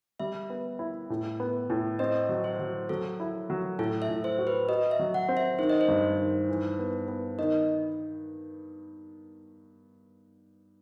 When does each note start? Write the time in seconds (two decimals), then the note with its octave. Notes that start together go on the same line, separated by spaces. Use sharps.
0.20 G3 E5
0.50 B3
0.79 E4
1.10 A2
1.40 B3
1.70 A2
1.99 C4 D#5
2.29 F#3
2.44 C5
2.59 F#3
2.89 F#3 A4
3.20 E4
3.50 F#3
3.79 A2 A4
4.02 E5
4.09 A2
4.24 C5
4.39 F#4
4.47 B4
4.69 F#4 D#5
4.91 E5
4.99 F#3
5.14 F#5
5.28 C4
5.37 E5
5.59 D#3 C5
5.69 D#5
5.81 C5
5.88 G2
6.18 D#3
6.49 E3
6.79 B3
7.08 B3
7.39 D#3 D#5